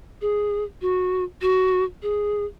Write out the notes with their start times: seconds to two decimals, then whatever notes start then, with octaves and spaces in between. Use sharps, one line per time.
0.21 G#4
0.81 F#4
1.42 F#4
2.02 G#4